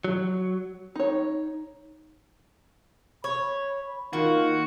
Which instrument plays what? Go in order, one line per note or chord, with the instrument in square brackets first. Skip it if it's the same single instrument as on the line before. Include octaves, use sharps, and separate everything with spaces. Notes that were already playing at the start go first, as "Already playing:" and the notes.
[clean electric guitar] F#3
[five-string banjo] D#4 C#5
[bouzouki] C#5 [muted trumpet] B5
[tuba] D#3 [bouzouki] A#3 [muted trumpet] F4 [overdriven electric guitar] F#4